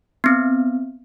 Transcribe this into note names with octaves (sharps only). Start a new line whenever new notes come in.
B3 C4